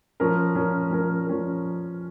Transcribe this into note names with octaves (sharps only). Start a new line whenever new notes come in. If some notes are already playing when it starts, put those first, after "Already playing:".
F3 C#4 A#4
F3 C#4 A#4
F3 C#4 A#4
F3 C#4 A#4